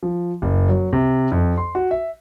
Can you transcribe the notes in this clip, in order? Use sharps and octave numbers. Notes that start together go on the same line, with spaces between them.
F3
F#1
F#3
C3
F2
C6
F#4
E5